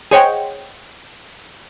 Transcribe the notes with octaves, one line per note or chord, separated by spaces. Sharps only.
G#4 C5 C#5 D#5 F#5 G5